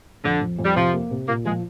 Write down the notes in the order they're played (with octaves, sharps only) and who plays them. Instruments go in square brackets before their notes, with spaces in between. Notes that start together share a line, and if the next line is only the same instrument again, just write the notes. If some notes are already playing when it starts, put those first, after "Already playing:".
[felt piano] F2 [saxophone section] D3
[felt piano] F2
F2
[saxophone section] G3
[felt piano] C3 [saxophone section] F3
[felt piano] A#3
C3
[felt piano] A#2 [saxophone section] A#3
[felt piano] F3 [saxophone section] G#3